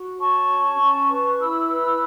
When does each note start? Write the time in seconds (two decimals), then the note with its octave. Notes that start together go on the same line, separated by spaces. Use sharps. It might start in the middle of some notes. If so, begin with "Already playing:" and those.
Already playing: F#4
0.19 C#5 A5 C#6
0.50 C#4
0.79 C#4
1.09 B4
1.39 E4 B5 E6
1.69 B4